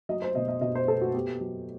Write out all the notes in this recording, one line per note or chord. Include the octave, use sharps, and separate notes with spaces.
F#3 D#5
C5
B2 D#5
D#5
B2 D#5
C5
B3 A4
F#4
B3 G4
F#3